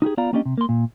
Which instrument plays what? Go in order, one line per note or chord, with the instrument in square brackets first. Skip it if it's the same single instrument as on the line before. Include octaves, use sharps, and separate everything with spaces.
[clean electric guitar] D#4 F4 G4 G#4
B3 F4 D5 F5 A#5
A#3 B3 C#4 D4 G4 D#5
C3
A#3 C6
A#2